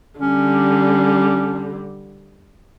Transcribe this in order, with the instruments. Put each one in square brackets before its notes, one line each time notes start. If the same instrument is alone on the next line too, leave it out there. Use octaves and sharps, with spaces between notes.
[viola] D3 G3 [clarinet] C#4